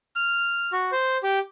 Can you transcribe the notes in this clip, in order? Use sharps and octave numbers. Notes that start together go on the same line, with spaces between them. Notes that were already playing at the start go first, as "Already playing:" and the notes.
F6
F#4
C5
G4